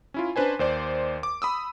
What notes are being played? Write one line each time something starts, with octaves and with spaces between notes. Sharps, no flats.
C#4 E4 F4
C#4 D4 B4 C5 G#5
D#2 C5 D5
D6
B5 D#6 E6